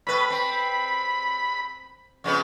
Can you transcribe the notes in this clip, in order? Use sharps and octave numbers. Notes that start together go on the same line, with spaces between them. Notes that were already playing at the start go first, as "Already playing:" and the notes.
A2 B4 B5
C4
F2 C#3 B3